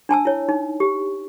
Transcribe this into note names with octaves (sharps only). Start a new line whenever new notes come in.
D4 G#5 A5 E6
E4 C#5
D#4
G4